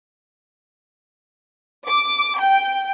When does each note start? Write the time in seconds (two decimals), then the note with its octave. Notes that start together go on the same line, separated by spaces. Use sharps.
1.88 D6
2.40 G5